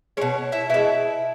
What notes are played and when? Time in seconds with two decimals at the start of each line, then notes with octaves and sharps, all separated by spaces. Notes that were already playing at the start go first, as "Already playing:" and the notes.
0.17 B2 G#3 C#4 C#5
0.52 E4 E5
0.70 B2 G#3 E4 E5